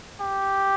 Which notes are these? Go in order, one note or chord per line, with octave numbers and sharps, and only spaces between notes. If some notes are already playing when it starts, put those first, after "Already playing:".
G4